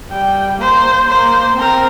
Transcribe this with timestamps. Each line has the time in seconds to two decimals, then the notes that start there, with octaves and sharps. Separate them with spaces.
0.11 G3 G5
0.60 A#3 C5
1.09 A#3 C5
1.58 C4 A#4